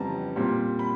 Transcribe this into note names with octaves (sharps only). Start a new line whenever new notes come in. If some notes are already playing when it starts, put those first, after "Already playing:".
Already playing: F2 C#3 E3 G3 B3 A5 A#5
A#2 G3 C4
B5